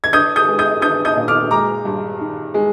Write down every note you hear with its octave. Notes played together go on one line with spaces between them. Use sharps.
G#6
D4 D#6 G6
D#6 G6
G#3
D#6 G6
D4 D#6 G6
D#6 G6
A#2
D6 F6
G#3 A#5 D6
G2
D#3
G#3